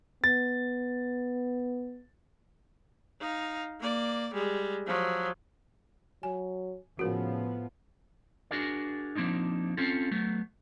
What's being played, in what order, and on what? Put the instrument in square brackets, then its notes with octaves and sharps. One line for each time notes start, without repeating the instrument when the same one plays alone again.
[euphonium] B3 [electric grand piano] A6
[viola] D#4 F5
A#3 D5
G3 G#3
F3 F#3
[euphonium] F#3 [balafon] G#5
[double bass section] A2 F3 B3 [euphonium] C#3 [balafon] F#4 A#4
[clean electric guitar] D4 F#4 G#4 A#4 D5
F3 A#3 C4 D4 D#4
C4 C#4 F4 A4
F#3 A3 B3